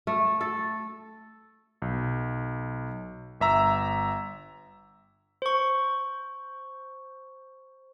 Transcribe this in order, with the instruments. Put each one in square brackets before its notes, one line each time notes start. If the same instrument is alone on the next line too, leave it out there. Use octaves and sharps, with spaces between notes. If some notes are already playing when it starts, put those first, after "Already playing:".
[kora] A3
A4
[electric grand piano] B1
G1 E5 A#5 E6
[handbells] C5 C#6